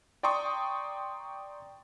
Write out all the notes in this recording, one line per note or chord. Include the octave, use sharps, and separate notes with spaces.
D5 G5 A#5 C6 C#6 D#6